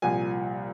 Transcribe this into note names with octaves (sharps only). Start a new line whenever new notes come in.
C2 A#2 F3 G#5